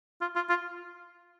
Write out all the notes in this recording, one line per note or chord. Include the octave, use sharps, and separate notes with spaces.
F4
F4
F4